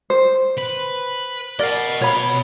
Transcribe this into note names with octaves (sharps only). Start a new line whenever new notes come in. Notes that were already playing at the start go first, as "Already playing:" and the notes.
C5
B4
A#4 D5 D#5 F#5
B2 C#5 B5